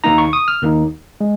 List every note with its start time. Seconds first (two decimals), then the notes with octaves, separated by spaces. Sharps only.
0.04 D#2 D#3 A#3 D#4 A#5
0.18 C#6
0.33 D#6
0.48 F6
0.62 D#2 D#3 A#3 D#4
1.21 G#3